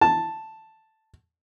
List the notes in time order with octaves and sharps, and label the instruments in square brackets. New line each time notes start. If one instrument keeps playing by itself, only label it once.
[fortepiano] A5